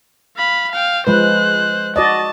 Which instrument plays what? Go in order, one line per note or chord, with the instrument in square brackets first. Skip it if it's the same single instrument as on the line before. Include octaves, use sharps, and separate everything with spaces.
[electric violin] F5 B5
F5 G5
[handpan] F3 G#3 B4 [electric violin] C5 F#6
[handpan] F#4 D5 D#5 [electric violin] A5